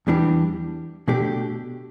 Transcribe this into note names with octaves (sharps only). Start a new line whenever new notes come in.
E2 E3 G3 D4 G4
B2 A3 D4 G4